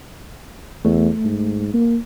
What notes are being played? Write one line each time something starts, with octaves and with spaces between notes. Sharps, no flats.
E2 A3
G#2
A#3